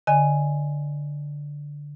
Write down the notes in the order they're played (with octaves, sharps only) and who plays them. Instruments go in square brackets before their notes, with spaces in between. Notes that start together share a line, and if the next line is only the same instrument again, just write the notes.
[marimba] D3 D#5 G#5